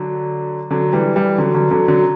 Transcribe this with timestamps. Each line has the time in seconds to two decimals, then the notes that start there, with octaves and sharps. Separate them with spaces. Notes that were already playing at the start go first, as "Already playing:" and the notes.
Already playing: D3 F#3
0.71 D3 F#3
0.93 E3 G3
1.16 E3 G3
1.38 D3 F#3
1.54 D3 F#3
1.71 D3 F#3
1.88 D3 F#3